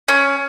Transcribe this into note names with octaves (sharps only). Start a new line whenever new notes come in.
C#4